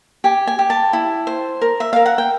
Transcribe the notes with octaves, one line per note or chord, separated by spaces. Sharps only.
G4 G#5
G#5
G4
A5
E4
C5
A#4
E5
A#4 F5
F#5
G5